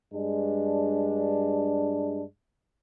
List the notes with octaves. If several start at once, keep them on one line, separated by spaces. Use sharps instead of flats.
G2 G#3 D4